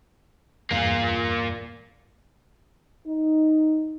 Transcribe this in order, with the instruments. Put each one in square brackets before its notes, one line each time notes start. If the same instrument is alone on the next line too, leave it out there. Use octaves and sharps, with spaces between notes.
[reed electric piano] E2 G2 [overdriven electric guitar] A#3 F4
[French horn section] D#4